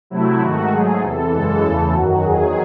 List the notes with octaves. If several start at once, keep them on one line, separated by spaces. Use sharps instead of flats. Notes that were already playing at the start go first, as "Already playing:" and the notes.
C3 F#3 A3 E4
G#2 D#3 A3 F#4
G#2 F#3 A3 G#4
E2 C3 E3 A4
F#2 C#3 E3 G#3
E2 C#3 E3 A3
F#2 D#3 F#3 F#4
E2 D#3 F#3 G#4